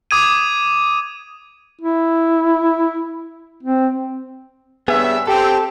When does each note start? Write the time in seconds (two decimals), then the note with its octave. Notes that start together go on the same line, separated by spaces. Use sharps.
0.11 D6 D#6 G#6 D#7
1.81 E4
3.63 C4
4.88 G2 B3 G#4 C#5 E5
5.27 C4 G4 A4